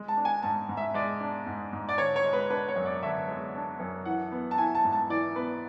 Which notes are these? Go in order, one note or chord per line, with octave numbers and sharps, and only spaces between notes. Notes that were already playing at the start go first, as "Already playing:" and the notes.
Already playing: G#3
A5
D4
G#5
G#2 A5
G#2
E5
G#3 D5
D4
G#2
G#2
D5
D3 C#5
C#5
G#3
B4
D4 B4
C#5
F#2
D5
D3 E5
G#3
D4
F#2
E3 F#5
B3
A5
E4 G#5
A5
G#2
A5
E3 D5
B3 B4